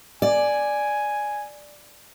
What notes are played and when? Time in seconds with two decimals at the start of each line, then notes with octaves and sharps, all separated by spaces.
0.22 D5 G#5